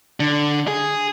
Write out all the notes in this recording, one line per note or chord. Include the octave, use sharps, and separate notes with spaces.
D3
G#4